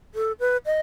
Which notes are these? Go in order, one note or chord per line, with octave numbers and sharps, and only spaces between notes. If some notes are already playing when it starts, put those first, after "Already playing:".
A4
B4
D#5